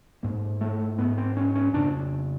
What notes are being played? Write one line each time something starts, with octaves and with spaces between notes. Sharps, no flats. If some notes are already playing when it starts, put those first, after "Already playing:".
G#2 A#3
A3
G#2 B3
C4
C#4
C#4
F2 C#3 D4